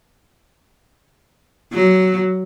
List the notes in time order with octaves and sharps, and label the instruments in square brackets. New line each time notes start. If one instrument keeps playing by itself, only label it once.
[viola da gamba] F#3